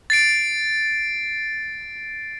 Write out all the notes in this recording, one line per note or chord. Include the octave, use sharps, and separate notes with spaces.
A6 C7 D7